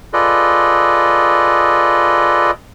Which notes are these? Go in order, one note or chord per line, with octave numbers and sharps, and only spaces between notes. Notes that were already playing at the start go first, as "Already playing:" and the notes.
F4 G#4 A4 B4 D5 D#5